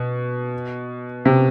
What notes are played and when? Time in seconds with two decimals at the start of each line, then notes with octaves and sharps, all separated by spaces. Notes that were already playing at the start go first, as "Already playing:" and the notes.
Already playing: B2
1.25 C3